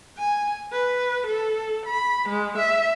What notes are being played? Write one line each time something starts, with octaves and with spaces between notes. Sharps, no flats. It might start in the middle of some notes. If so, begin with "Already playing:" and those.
G#5
B4
A4
B5
G#3
E5